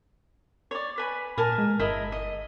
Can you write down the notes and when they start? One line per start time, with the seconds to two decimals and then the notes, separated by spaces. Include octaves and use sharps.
0.71 C#5 D5
0.98 B4 G#5 B5
1.38 A#2 A#4 G#5 A5
1.58 G#3
1.79 G1 E4 A#4 D#5
2.12 D#5